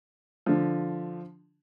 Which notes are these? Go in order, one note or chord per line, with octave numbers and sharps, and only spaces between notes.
D3 F3